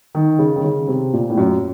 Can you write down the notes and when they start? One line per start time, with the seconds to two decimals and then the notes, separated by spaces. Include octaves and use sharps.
0.15 D#3
0.39 C#3
0.56 D#3
0.64 C#3
0.88 C3
1.13 A#2
1.30 A2
1.38 F#2